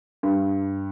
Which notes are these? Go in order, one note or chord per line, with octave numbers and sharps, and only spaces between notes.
G2